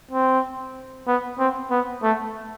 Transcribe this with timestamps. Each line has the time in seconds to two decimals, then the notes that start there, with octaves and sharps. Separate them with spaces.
0.11 C4
1.07 B3
1.39 C4
1.71 B3
2.02 A3